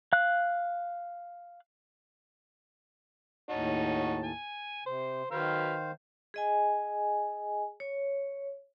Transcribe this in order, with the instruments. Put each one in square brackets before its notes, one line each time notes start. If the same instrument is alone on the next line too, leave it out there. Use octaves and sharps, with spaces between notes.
[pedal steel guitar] F5 F#6
[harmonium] D#2 A2 A5 [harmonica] C#4 D#4 F#4
[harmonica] G#5
[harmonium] C3 [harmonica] C5
[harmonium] D#3 C5 F5 [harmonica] F#3 B4 F6
[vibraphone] G#4 D#5 G#5
C#5